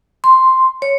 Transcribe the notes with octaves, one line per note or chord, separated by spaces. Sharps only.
C6
C#5